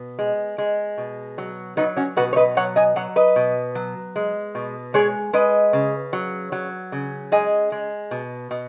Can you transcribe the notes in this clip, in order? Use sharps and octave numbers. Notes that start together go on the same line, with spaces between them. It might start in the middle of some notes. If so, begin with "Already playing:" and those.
Already playing: B2
G#3
G#3
B2
F#3
F#3 B3 D#4
C#4 F#4
B2 F#4 B4
C#5
B4 D#5
F#3 C#5 F#5
D#5 G#5
F#3 C#5 F#5
B4 D#5
B2
F#3
G#3
B2
G#3 G#4 C#5
G#3 B4 D#5
C#3
F#3
F#3
C#3
G#3 D#5 G#5
G#3
B2
B2